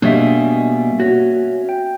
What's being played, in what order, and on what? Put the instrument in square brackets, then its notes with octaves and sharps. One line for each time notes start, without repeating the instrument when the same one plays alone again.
[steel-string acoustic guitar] B2 G3 G#4 [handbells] A#3 E5 [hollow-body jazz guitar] D4 C#5 D#5
[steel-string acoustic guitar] C#4 [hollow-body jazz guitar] F#4
[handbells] G5